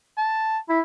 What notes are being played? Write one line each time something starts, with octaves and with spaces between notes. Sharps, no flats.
A5
E4